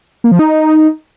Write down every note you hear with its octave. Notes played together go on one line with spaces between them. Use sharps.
A#3
F3
D#4